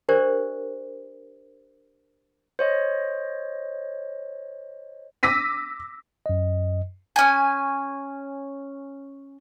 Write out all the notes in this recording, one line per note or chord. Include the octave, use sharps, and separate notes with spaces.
D4 G4 A#4 C5 D5
C5 C#5 D#5
D6 E6 A#6 B6 D#7
F#2 D#5
C#4 G#5